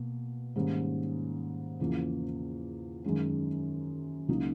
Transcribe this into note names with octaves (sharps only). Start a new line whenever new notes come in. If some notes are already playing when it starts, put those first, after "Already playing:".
Already playing: B2 A#3
G#2 D#3 G3 A#3 C#4
E2 C#3 F3 A#3
F#2 D#3 G#3 C#4
C#2 C#3 F#3 A#3 D#4